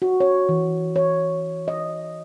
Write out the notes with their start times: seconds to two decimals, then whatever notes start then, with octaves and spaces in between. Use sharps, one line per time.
0.02 F#4
0.20 C#5
0.49 E3
0.96 C#5
1.68 D#5